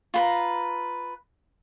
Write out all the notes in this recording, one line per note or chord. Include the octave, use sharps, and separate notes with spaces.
F4 B4 A#5